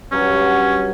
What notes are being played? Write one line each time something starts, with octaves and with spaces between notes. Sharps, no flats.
G2 F#3 C#4 F#4